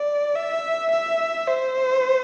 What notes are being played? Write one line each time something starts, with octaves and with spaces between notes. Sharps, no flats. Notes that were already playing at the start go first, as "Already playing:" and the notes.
Already playing: D5
E5
E5
C5